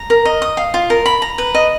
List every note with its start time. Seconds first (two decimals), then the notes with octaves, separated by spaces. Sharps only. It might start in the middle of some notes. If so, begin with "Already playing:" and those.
Already playing: A#5
0.10 A#4
0.25 D#5
0.42 D#6
0.57 F5
0.74 F4
0.90 A#4
1.06 B5
1.22 A#5
1.38 B4
1.55 D#5